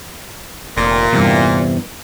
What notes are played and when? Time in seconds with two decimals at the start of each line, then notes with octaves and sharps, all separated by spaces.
0.77 F1 A#2
1.13 E2 G2 C3 E3